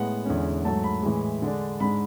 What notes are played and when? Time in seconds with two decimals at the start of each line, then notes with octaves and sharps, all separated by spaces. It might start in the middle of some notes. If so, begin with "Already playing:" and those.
Already playing: A2 G#3 B3 F#5
0.25 E2 D3 G#3 C#4
0.65 G#2 F#3 A3 A5
0.84 B5
1.03 A2 E3 G#3
1.42 D3 G#3 D4
1.80 G#2 G#3 D4 B5